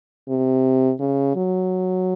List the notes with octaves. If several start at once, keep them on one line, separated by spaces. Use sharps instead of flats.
C3
C#3
F#3